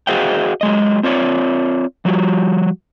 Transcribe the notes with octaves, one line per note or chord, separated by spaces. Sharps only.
F#4 G#4 C5 D#5 F5 G5
F#3 G#3 D#5
C4 F4 C#5 D5
F3 G3 F#4